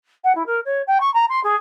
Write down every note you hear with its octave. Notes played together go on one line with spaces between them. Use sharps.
F#5
E4
A#4
C#5
G5
C#6
A#5
C6
G#4